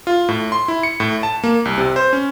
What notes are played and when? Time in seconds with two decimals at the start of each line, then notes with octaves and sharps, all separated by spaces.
0.07 F4
0.29 A2
0.52 C6
0.68 E4
0.83 C#7
1.00 A2
1.23 A5
1.44 A#3
1.65 C2
1.78 C3
1.96 C5
2.13 C#4